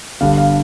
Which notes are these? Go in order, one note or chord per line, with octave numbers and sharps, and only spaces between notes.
G1 G2 D3 F5
F5